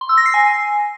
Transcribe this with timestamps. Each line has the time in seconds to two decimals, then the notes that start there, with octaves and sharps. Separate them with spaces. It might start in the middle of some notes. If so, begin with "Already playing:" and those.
0.01 C6
0.09 E6
0.17 A#6
0.26 C7
0.34 G#5